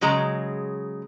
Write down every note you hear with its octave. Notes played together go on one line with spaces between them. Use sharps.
C#3 F#3 G#3 A#5